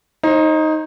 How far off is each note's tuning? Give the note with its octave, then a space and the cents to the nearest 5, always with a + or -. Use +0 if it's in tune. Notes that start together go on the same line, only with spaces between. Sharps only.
D#4 +5 C5 +40